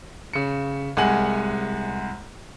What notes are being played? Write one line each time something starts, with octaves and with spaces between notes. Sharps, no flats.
C#3 C#7
C2 G#3 F#5 G#5 F#7